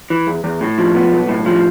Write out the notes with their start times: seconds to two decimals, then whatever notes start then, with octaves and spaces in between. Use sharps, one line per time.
0.10 E3
0.27 E2
0.44 E2
0.61 A2
0.78 F3
0.95 B3
1.12 B1
1.28 A2
1.46 F3